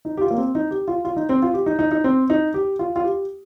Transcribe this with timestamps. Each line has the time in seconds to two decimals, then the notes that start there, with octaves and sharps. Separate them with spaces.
0.05 D#4
0.17 G4
0.21 F4
0.31 A#3
0.38 C4
0.55 D#4
0.71 G4
0.88 F4
1.05 F4
1.17 D#4
1.29 C4
1.42 F4
1.54 G4
1.66 D#4
1.79 D#4
1.91 D#4
2.04 C4
2.30 D#4
2.54 G4
2.79 F4
2.96 F4
3.04 G4